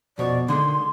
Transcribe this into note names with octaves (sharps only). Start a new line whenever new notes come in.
F2 B2 C#5 D5
D3 D#3 G#3 C6